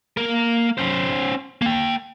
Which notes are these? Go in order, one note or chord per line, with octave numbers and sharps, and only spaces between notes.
A#3 A#4
C#4 C5
A#3 G5